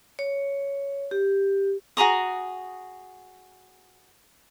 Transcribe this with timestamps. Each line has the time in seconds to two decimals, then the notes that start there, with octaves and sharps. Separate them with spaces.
0.19 C#5
1.11 G4
1.97 F#4 G#4 A#5 D#6